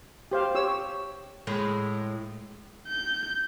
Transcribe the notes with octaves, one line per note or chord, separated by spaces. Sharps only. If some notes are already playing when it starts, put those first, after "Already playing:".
G4 C5 F5
G4 C#5 E6
A2 G#3
G6